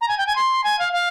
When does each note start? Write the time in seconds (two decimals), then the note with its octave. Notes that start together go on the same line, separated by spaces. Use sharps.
0.01 A#5
0.08 G#5
0.18 G5
0.27 G#5
0.36 C6
0.64 G#5
0.79 F5
0.93 F5